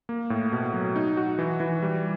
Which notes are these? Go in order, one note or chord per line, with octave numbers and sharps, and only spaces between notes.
A#3
A2
B2
F#3
D#4
F#4
E3
E3
G3